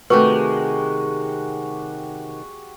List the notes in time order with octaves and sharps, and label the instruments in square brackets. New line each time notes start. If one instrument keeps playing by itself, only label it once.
[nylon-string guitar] C3 D#3 A3 [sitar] G#3 [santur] F#4 G4 [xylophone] B4